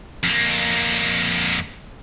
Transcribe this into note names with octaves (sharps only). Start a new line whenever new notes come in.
F2 A#3